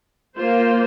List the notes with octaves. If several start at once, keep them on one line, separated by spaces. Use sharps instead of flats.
A#3 F4 C5